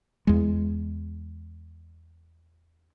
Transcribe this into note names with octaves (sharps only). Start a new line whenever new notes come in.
E2 G#3